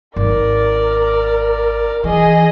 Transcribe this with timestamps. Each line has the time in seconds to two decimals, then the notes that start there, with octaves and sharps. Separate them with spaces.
0.16 G#1 A#4 D5
2.04 E3 G#4 D#5